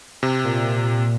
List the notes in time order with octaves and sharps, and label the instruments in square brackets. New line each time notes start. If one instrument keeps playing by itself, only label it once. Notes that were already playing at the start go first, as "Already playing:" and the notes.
[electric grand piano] C3
[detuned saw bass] A#2